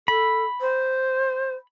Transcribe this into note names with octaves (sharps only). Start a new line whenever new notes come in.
A4 B5
C5